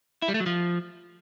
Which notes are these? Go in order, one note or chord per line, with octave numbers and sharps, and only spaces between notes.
E4
G3
A3
F#3
F3